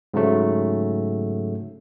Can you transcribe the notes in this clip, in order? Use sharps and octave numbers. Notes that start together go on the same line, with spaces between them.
G#2 C#3 F#3 A3